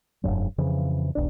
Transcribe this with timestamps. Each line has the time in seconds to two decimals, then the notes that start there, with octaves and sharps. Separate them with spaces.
0.24 F1 B1 G2 F#3
0.58 F2 C#3 E3 F3
1.15 E1 B1 D4